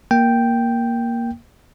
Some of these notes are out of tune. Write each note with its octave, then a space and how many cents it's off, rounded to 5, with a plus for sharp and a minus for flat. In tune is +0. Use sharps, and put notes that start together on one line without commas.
A#3 +5 G5 +0